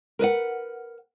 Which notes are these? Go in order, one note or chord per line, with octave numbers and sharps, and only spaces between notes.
A#4 B4 D#5 F#5